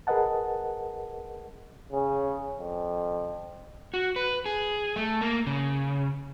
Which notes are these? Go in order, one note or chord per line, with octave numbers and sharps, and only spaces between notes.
G#4 A#4 B4 D#5 F#5 A5
C#3
F2
F#4
B4
G#4
A3
A#3
C#3